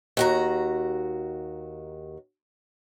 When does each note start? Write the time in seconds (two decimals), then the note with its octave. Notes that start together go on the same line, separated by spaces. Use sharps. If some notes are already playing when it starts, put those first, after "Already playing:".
0.17 D#2 F#4 A#5